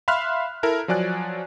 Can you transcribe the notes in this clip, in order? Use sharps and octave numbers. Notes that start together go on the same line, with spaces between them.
E5 F5 B5 C6 F6 F#6
E4 A4 A#4
F3 F#3 D5 G#5 F#6